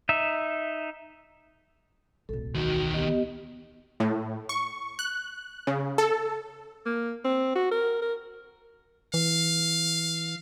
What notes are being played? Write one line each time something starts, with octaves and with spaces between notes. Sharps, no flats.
D#4 E5
D1 B1 A4
E2 D#3 F#4
B3 G4 D#5
A2
C#6
F#6
C#3
A4
A#3
C4
F#4
A#4
A#4
E3 F5